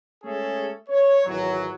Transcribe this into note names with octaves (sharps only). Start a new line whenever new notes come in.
G#3 A3 C#4 G#4 A4
C#5
G#1 E3 F#3